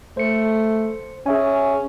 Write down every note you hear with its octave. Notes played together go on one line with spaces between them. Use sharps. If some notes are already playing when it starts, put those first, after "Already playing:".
A3 C5 C#7
C#4 G#4 E5 G#5